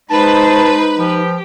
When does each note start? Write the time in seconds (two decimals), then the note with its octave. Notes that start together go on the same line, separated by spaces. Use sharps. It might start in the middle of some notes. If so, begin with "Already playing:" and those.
0.10 G#3 D#4 B4 C5 A5
0.98 F3 G4